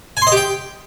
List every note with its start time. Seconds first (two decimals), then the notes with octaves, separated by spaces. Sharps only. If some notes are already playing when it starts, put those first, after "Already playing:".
0.17 G#5
0.22 C6
0.27 D#5
0.32 G4
0.37 G5